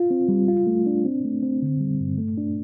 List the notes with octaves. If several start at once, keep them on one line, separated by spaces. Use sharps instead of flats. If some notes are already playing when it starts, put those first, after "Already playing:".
Already playing: F4
C4
G3
F4
A3
D4
C4
A3
C4
D3
G3
G2
A3
D4